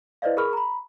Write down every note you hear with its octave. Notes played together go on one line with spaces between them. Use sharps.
E4 B4 C5 D5 D#5 F5
G#4 A#4 B5 C#6 F6
A#5 B5